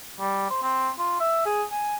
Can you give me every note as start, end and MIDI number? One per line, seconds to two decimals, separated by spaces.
0.20 0.48 55
0.50 0.59 72
0.62 0.90 60
0.99 1.16 65
1.20 1.45 76
1.46 1.63 68
1.71 1.96 80